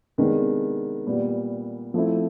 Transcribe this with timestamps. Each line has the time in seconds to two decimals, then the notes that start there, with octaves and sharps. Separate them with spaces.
0.18 C3 D#3 G#3 B3 D4
1.06 A#2 G3 B3
1.94 F3 A3 C4 E4